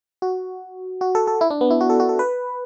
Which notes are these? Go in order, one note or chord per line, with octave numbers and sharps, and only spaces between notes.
F#4
F#4
A4
A4
E4
D4
B3
E4
F#4
A4
F#4
A4
B4